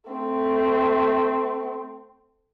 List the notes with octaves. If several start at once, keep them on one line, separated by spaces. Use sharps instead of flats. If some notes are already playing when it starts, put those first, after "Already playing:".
A3 C4